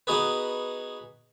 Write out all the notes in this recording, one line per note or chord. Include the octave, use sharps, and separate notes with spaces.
B3 D#4 F#4 G#4 B4